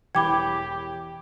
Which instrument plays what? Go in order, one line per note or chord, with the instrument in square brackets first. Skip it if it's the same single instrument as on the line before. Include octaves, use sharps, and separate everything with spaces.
[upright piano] E1 E3 G7 [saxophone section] G4 [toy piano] G5 [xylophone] B5 D6 G#6